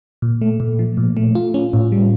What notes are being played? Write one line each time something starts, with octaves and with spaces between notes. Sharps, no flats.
A#2
A3
A#2
F3
A#2
A3
F4
C#4
A2
G3